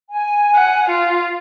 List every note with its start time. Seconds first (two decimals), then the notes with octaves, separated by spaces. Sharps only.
0.10 G#5
0.55 F#5
0.89 F4